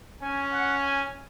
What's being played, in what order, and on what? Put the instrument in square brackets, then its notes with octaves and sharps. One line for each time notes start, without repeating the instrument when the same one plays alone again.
[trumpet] C#4 [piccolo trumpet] G#5
[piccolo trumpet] F#5
G#5